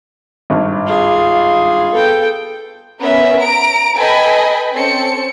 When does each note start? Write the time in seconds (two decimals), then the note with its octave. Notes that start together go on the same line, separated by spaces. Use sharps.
0.50 G#1 G2
0.86 F4 G#4
1.93 B3 A4 G5
3.01 B3 C#4 A#4 E5
3.42 A#5 D7
3.98 A4 B4 D#5 G5 G#5 B5
4.74 C4 C#4 A4 C#7